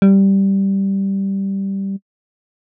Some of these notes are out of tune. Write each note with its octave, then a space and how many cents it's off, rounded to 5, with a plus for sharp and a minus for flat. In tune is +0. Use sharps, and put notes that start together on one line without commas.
G3 -5